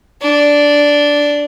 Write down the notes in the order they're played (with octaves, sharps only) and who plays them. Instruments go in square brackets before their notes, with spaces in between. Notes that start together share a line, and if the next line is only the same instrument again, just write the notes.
[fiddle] D4